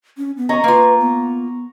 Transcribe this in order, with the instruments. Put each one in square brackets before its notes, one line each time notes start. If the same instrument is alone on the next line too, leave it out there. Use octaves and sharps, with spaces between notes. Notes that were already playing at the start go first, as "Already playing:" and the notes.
[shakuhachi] C#4
B3
[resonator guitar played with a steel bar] C#4 D#5 [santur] A#5 C#6
[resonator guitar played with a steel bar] A#3 F4 [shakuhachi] B4
[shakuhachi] B3